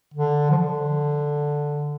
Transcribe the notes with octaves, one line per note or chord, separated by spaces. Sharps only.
D3
F3
D3